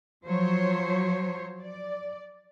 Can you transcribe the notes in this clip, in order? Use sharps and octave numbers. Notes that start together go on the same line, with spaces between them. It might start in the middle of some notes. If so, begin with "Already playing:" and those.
F3 F#3 C5 C#5
D5